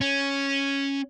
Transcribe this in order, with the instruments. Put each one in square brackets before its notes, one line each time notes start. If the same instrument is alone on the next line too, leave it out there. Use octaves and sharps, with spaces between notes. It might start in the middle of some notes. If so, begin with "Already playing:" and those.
[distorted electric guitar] C#4